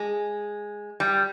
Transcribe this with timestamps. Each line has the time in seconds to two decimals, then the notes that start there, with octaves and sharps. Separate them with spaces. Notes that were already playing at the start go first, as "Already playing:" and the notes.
Already playing: G#3
1.00 G3